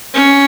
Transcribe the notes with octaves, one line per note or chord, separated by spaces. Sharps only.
C#4